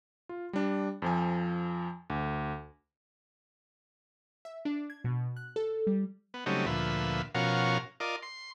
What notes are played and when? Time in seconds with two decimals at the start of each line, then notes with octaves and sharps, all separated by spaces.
0.29 F4
0.53 G3 D4
1.02 F2 F3 G#5
2.10 D2
4.45 E5
4.65 D4
4.90 G#6
5.04 B2
5.37 F#6
5.56 A4
5.87 G3
6.34 B3
6.46 C#3 F#3 G3 A3 C4 D#4
6.66 D2 A#2 F3 B4 E5
7.35 B2 F3 C#4 F#4 A#4 F5
8.00 F4 A#4 D5 D#5
8.23 C6